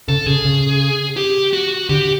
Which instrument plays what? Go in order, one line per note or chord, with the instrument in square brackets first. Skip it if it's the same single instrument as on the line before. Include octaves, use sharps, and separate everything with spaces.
[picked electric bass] C#3 [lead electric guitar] A4
[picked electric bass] C#3 [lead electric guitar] G#4
[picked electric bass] C#3
[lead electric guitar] G4
F#4
[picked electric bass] D3 [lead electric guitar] G4